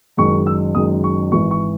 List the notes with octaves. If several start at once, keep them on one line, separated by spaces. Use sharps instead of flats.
F#1 F#2 D#3 G#3 C#6
E6
F#1 F#2 D#3 G#3 D#6
C#6
G#1 G#2 E3 C#6
C#6